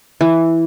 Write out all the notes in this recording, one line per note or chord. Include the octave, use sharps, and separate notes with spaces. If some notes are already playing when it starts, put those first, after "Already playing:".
E3